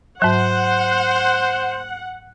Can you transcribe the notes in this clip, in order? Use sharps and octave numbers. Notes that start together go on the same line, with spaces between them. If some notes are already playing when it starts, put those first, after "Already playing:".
G#2 F#3 C5 F#5